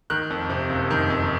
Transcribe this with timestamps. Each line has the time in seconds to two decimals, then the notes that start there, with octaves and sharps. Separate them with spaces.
0.10 D#3 F#6
0.30 F2
0.50 C3
0.70 F#1
0.91 D#3
1.10 F2